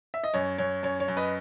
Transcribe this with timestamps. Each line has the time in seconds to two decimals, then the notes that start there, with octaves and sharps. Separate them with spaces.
0.14 E5
0.24 D#5
0.34 F#2 C#5
0.58 F#2 C#5
0.83 F#2 C#5
1.00 C#5
1.08 F#2
1.17 B4 D#5